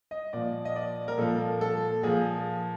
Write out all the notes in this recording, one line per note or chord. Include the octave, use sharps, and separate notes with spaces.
D#5
A#2 F3 D5
D#5
D5
A#4
A#2 F3 A4
A4
A#2 F3 G#4